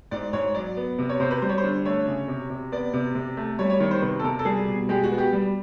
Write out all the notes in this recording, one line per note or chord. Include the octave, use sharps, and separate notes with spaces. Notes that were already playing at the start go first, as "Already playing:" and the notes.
G#2 D5
G#2 C#5
F#3 D5
B3
C3
C#5
C3 C5
B4
G3 C5
C#5
C5
D3
A3 C#5
C#3
C3
C3
B3 D5
C3
C3
A3
G3 C#5
C#5
D#3 C#5
C5
C3 B4
A4
C3 A#4
A4
G3 G#4
B2
G#3 G4
F#4
B3
G4
G3